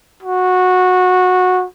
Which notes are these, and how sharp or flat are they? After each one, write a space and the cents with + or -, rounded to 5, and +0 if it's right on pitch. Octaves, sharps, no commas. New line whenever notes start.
F#4 -15